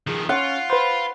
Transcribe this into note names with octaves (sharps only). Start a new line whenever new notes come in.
D#3 F3 G#4
C#4 F4 F#5
B4 C5 B5